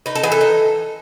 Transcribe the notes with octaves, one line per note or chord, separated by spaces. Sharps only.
D#4 B4
A4
E3 G#4
A4
D#4